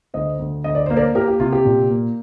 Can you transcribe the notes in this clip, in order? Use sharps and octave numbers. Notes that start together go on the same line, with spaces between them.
D2 C5 D#5
D2
D2 D#5
D5
A#3 C5
A#4 D5
A#3 G4 A#4
G4
C3 F4
G4
A#2
A#3